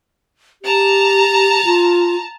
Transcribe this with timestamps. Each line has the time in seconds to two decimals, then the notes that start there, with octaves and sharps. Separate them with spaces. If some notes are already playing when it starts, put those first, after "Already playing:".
0.62 G4 A5 A#5
1.65 F4